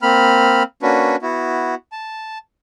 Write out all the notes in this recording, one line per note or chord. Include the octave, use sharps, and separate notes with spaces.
A#3 C4 B5 F6
A#3 C#4 D4 F#4 B4
B3 E4 F#4
A5